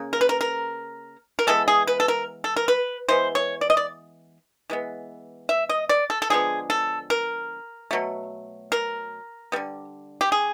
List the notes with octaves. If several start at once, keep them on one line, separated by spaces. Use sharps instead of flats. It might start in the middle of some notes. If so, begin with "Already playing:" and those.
Already playing: C#3 A#3
A#4
B4
A#4
A#4
A#4
E3 G#3 B3 A4
G#4
B4
A4
A#4
A4
A#4
B4
E3 G#3 B3 C5
C#5
D5
D#5
D5
E3 G#3 B3
E5
D#5
D5
A4
A4
D3 F3 G#3 B3 G#4
A4
A#4
B2 F#3 A3
A#4
D3 G3 B3
G4
G#4